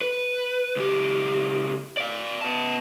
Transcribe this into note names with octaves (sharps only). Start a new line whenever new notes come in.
B4
C#2 G4
D5 F5
B3 A5